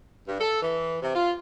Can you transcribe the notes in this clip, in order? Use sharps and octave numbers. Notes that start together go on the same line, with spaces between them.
G2
A4
E3
C3
F4